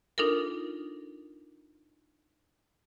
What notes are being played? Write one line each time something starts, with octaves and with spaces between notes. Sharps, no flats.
D4 D#4 F4 A4 A#4